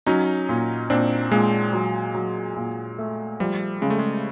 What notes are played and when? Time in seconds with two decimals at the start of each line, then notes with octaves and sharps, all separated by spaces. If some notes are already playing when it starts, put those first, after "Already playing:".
0.06 F#3 C#4 D#4
0.49 A#2
0.90 A#2 C4 D4
1.31 A#2 G#3
1.73 F#3
2.14 F#3
2.56 A#2
2.98 A3
3.40 F3 G3
3.82 C#3 G#3
3.90 A3
3.99 G#3